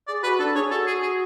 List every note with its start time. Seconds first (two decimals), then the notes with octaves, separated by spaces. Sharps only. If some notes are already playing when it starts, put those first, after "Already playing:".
0.08 G#4 D5
0.23 F#4 B4
0.39 D4 A4
0.55 G#4 C#5
0.71 F#4 A4
0.87 G#4
1.03 G#4